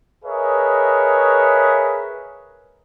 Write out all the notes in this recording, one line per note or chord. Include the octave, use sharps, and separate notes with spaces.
G#4 A#4 B4 C#5 D#5 E5